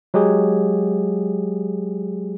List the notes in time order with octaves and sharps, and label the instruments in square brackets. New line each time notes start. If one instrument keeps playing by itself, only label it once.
[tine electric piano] F#3 G#3 G4 G#4